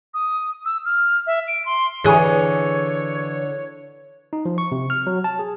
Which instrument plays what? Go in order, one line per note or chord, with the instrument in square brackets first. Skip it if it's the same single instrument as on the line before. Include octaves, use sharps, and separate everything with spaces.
[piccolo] D#6
E6
F6
E5
D7
C6
[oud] D3 G#4 [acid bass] E3 [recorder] C#5
[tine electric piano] D#4
F3
C#6
C3
F6
F#3
A5
G#4